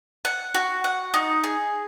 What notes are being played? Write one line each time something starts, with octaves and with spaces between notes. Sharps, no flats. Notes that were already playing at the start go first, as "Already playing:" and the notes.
F#5
F#4
F#5
D#4
G#4